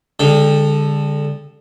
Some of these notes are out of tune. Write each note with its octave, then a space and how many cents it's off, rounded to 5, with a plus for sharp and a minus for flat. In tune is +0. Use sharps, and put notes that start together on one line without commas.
D3 -10 G#3 -35 G5 +20